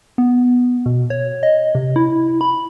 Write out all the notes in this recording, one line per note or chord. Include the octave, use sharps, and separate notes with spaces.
B3
B2
C#5
D#5
C3
E4
B5